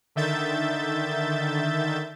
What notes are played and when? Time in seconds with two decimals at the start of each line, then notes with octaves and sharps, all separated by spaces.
0.16 D3 D#3 E5 G6 A6